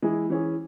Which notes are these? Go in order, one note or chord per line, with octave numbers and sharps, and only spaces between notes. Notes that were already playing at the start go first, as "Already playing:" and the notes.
E3 G#3 E4 G#4
E3 C#4 G#4